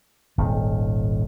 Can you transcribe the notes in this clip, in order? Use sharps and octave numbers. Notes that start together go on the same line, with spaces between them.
D#1 G#1 D#3